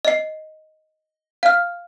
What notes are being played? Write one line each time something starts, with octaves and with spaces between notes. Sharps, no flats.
D#5 C7
F5 F6